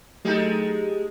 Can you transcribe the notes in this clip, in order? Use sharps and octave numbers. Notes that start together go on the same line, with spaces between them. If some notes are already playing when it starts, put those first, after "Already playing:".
F#3 G#3 A3 D#4 G4 A4